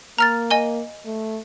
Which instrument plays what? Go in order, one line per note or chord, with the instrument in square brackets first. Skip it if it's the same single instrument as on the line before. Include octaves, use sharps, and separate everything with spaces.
[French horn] A#3 [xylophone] A#5 F6 A6
[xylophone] D#5 G#5 G7
[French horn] A3